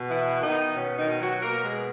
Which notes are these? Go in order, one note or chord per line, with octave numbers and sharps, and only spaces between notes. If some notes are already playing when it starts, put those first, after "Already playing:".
Already playing: B2
E3 B3 E4
D#3 B3 D#4
B2 C#4
D#3 D#4
B2
F#3 F#4
B2 A#3 A#4
G#3 G#4
B3